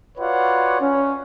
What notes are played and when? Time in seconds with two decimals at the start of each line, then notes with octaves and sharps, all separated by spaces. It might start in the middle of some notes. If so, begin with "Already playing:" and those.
0.18 F4 F#4 B4 C#5 D5 F#5
0.81 C#4